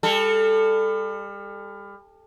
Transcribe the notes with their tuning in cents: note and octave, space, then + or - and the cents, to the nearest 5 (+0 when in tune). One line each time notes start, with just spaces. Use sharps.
G3 +35 A4 +0